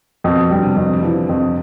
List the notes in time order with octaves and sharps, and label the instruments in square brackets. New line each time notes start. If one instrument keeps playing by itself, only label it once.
[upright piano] F2 [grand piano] B2
[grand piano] D3 [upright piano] G3
[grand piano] C3
[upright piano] F2
[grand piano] G3
[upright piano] E3 [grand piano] F3
[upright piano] F2